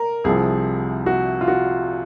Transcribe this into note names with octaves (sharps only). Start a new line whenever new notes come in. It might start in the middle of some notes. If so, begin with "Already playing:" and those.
Already playing: A#4
C2 C3 F3 G#4
F#4
F4
F#4